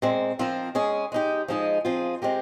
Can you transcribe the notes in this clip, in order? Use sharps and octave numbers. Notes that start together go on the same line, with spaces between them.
A#2 G#3 C4
F3 C4 F4 A#4
G#3 C#4 G#4
G#3 D#4 G4
F3 G#3 D#4 G#4
F3 C4 F4 G#4
G#3 C4 G4 A#4